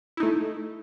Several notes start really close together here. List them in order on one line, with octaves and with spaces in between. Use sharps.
E4 D#4 A3